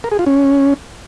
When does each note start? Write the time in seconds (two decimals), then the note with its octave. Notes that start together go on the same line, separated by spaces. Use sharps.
0.04 A#4
0.12 G#4
0.19 F4
0.27 C#4